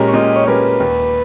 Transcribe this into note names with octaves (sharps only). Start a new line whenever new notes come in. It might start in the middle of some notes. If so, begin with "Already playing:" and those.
Already playing: A#2 G#3 C#4 G4 A#4
C#5
A#2 D#5
C#5
G#3 C#4 G4 A#4 B4
D#2